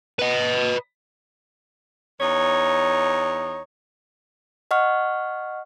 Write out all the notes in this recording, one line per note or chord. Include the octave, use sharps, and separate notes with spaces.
B4 D#5
E2 D#4 C#5
D#5 F#5 C#6 F6